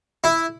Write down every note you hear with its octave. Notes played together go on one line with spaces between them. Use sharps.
E4